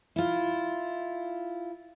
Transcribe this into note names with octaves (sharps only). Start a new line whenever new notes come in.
E4 F4